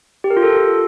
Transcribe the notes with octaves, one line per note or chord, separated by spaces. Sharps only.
G4
A#4
F4
A4